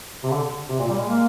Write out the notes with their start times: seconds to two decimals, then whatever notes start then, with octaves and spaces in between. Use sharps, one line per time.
0.24 C3
0.31 D3
0.69 C3
0.79 A#2
0.88 G3
0.98 G#3
1.08 A#3